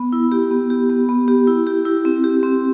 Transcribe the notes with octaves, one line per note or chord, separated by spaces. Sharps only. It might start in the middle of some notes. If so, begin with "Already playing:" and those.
Already playing: B3
E4
G4
B3
G4
B3
B3
G4
E4
G4
E4
C4
G4
C4